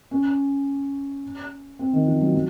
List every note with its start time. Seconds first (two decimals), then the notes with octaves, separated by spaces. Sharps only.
0.11 C#4
1.79 C4
1.93 D#3
2.06 F3
2.21 F#3
2.34 F#3